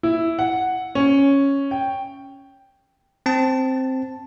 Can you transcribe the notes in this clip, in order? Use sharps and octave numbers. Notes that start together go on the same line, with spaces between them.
E4
F#5
C#4
G5
C4 A5